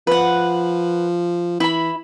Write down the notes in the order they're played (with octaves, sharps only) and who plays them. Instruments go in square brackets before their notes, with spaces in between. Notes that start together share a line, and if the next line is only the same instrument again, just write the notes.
[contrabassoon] F3 [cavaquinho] B4 F#5
[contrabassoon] E3 [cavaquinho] E4 B5